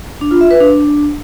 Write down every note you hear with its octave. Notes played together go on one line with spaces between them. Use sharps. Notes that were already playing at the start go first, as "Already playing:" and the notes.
D4
F4
E5
B4
D4